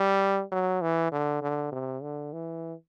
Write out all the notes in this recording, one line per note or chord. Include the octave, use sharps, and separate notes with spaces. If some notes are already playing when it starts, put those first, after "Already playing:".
Already playing: G3
F#3
E3
D3
D3
C3
D3
E3